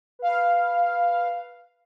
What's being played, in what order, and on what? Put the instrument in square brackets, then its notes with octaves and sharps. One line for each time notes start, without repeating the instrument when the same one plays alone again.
[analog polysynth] B4 F5